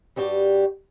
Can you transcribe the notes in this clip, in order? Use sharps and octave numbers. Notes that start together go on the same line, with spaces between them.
G2 G3 F#4 G4